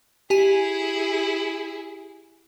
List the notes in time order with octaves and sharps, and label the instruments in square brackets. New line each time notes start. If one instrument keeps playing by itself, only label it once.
[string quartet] E4 G#4 [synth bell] G4 G#5 D#7